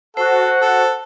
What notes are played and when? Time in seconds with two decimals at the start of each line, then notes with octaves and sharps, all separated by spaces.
0.17 F#4 A4 C5 F#5
0.61 A4